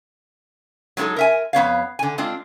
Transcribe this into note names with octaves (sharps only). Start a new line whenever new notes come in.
F#3 G#3 B3 D#4 A4
A#4 E5 G#5
F2 B3 C#5 F5
D3 G#5
G#3 C4 D4 F4